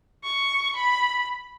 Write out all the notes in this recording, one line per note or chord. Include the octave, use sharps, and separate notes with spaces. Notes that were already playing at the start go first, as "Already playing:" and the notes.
C#6
B5